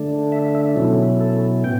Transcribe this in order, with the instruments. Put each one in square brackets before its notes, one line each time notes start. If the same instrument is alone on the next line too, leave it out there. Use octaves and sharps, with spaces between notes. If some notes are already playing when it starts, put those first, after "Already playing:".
Already playing: [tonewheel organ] D3 A3 D4
E5
E5
B2 F#3 C#4 E4 A4
A4
A2 B3 G5